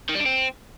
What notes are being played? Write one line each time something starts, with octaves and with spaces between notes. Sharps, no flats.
D#3
G3
D4
C4